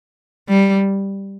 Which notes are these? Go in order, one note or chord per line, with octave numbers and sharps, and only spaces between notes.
G3